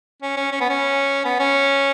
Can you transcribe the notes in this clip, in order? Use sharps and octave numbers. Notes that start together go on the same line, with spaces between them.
C#4
C#4
C#4
B3
C#4
B3
C#4